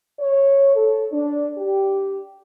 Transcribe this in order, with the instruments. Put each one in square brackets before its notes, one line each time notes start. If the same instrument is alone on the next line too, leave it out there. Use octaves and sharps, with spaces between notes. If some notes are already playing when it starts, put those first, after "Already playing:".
[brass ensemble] C#5
A4
D4
G4